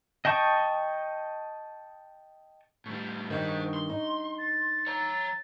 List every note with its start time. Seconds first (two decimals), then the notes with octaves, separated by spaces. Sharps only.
0.25 D#5 G5 A5 C#6 D#6
2.86 A2 G3 C#6
3.30 G2 D#3 G#4 C5
3.74 C6
3.89 D#4
4.38 A6
4.87 C#5 A#5